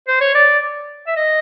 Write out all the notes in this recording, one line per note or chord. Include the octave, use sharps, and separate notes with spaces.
C5
C#5
D5
E5
D#5